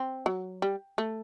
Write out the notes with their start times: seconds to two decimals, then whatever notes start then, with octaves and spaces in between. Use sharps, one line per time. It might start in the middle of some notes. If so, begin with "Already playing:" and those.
Already playing: C4
0.26 F#3
0.62 G3
0.98 A3